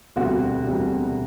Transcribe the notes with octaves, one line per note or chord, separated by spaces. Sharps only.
E1 D2 C3 G3 F#4
E1 D2 C3 G3